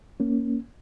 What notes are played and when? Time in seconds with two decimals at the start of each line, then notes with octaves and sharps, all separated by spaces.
0.20 A#3 C#4